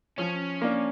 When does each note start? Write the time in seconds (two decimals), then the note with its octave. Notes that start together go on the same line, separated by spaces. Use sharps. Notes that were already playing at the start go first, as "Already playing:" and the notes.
0.18 F3 C#4
0.62 A#3 D4